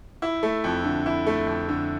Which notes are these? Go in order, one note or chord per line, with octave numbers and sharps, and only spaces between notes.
E4
A3
F2
D3
E4
A3
F2
D3